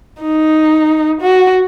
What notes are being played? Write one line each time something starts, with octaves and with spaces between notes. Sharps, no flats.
D#4
F#4